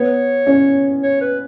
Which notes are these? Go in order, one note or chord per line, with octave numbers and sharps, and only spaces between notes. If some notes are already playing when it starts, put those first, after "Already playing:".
Already playing: B3 C#5
C#4
C#5
B4